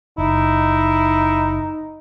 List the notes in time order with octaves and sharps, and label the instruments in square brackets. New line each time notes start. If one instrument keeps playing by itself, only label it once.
[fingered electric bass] F#1 [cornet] D#4 [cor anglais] E4